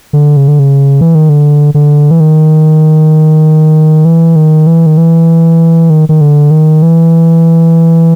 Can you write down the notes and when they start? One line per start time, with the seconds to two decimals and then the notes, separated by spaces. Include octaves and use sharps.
0.13 D3
0.37 C#3
0.48 D3
0.59 C#3
1.01 E3
1.15 D#3
1.29 D3
1.74 D3
2.11 E3
2.20 D#3
4.05 E3
4.36 D#3
4.67 E3
4.86 D#3
4.98 E3
5.90 D#3
6.09 D#3
6.21 D3
6.51 D#3
6.82 E3